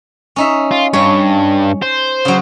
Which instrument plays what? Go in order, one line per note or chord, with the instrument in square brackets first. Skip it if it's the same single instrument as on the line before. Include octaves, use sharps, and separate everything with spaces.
[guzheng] C#4 D#4 E5
[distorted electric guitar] F4
[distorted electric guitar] G2 [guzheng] C#5
[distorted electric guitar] C5
[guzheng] C#3 F#3